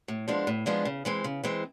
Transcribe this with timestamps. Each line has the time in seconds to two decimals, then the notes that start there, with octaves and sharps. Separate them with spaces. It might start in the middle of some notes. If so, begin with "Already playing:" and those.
0.08 A2
0.28 F3 G#3 B3 D4
0.47 A2
0.66 F3 G#3 B3 D4
0.85 C#3
1.05 E3 G#3 C4
1.24 C#3
1.44 E3 G#3 C4